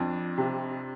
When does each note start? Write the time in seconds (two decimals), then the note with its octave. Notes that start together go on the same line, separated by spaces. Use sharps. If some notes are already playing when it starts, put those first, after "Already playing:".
Already playing: F2 D4
0.37 C3